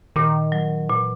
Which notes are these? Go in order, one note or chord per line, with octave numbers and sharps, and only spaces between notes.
A#2 D#3
F#3
A#2 E3